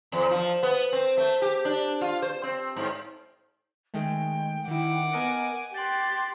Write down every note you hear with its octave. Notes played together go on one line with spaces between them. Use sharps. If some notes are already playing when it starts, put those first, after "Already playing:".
E2
F3
B3
C4
A3
G4
D4
F4
C5
C4
G#2
D#3 G#3 A3 G5
D#3 E4 F#5 D6
B3 A#4 D#5 G#5
G4 G5 C6 F#6 A6